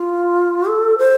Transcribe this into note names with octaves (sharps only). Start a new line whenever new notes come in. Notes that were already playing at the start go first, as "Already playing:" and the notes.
Already playing: F4
A4
C5